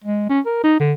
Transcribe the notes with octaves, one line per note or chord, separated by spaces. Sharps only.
G#3
C#4
A#4
D#4
D3